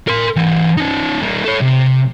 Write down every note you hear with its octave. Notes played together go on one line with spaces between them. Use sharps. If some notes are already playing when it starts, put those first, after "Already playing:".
A#4 C6
E3 G4
C#4 D#4
G3 A#3
A4 C#5
C3